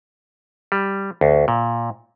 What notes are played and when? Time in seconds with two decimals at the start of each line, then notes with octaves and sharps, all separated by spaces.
0.72 G3
1.21 D2
1.48 A#2